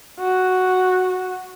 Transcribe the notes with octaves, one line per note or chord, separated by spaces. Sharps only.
F#4